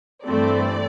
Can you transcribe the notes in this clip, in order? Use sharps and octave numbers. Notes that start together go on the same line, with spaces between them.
G2 E3 A3 C4 D5